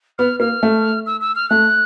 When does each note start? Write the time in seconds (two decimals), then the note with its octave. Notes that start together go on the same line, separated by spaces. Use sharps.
0.18 B3 F6
0.40 A#3 F6
0.63 A3
1.06 E6
1.21 E6
1.36 F6
1.50 A3 F#6